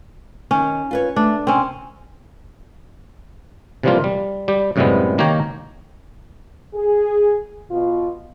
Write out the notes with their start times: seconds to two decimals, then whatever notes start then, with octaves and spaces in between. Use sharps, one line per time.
0.51 D#3 C#4
0.91 F4 B4 C#5
1.16 A3 D4
1.47 C3 C4 C#4
3.83 C3 E3 F3 G3 A#3 F4
4.04 G3
4.48 G3 G4
4.76 F#2 A2 C3 G3 G#3 B3
5.18 D#3 A#3 G4 C#5 G5 A#5
6.75 G#4
7.70 B2 F4